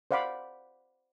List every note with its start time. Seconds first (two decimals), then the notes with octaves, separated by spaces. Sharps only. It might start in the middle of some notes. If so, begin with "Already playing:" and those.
0.11 C5 D5 F5 F#5 B5 D6